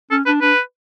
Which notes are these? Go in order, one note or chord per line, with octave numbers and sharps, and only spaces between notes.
C#4 A4
D4 B4
D4 B4